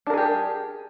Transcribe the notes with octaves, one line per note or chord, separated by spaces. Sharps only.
D4 G4 G#4 A#4